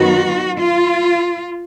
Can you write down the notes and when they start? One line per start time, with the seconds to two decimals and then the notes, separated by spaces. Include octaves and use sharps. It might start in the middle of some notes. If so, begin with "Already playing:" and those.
Already playing: F#2 D#3 F#3 B3 F#4
0.58 F4